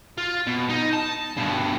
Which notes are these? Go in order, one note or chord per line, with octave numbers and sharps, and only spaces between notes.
F4
B2
D#4
A5
G2 B2